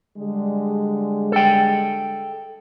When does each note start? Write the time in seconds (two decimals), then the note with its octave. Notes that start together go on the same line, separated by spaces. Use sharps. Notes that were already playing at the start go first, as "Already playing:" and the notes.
0.17 D3 G3 G#3
1.32 A4 G5